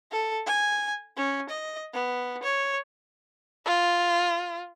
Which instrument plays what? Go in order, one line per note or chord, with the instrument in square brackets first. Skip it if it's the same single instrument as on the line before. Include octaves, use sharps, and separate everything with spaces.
[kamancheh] A4
G#5
C#4
D#5
B3
C#5
[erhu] F4